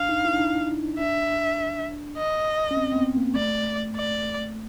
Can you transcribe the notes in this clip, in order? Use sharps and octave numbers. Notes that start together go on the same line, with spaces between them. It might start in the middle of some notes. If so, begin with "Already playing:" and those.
Already playing: D4 F5
D#4
E4
D4
D#4
D4 E5
D#5
C#4
C4
C4
B3
A#3
A3 D5
D5